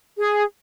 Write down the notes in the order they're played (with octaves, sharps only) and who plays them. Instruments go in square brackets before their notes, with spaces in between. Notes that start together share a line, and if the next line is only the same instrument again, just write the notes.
[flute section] G#4